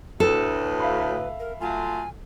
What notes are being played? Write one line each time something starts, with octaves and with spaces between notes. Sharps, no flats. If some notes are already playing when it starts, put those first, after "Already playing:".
D2 A2 A4 B4
E5 F5 B5
A#4
F#3 A3 F4 G#5